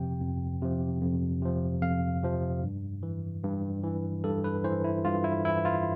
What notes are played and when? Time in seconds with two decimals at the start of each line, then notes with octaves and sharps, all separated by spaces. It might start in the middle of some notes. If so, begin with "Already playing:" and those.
Already playing: F2 C3 F3 G5
0.21 F2
0.62 C3 F3
1.02 F2
1.42 C3 F3
1.82 F2 F5
2.23 C3 F3
2.63 G2
3.03 E3
3.44 G2
3.83 E3
4.24 G2 A4
4.44 B4
4.64 E3 C5
4.84 E4
5.04 G2 F4
5.24 E4
5.45 E3 E4
5.65 F4